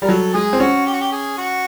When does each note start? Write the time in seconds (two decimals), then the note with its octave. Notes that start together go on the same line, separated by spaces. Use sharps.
0.02 G3 A#4
0.08 F#3 A4
0.33 G#3 G#4
0.53 C4
0.60 C#4 F#4
0.86 G4
0.93 F#4
1.01 G4
1.12 G#4
1.37 F#4